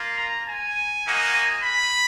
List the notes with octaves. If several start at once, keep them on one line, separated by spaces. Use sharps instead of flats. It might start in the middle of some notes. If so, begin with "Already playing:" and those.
Already playing: A#3 F4
A#5
G#5
A#3 D#4 F#4
B5